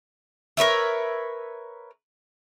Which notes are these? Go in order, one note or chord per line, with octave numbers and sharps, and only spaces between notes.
A#4 B4 C#5 E5